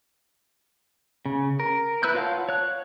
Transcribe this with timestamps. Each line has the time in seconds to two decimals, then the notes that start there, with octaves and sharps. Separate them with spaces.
1.26 C#3
1.60 A#4
2.03 E4 B4 E6 F#6 G6
2.15 F4 C#5 F5 F#5 A5
2.49 C#5 F#6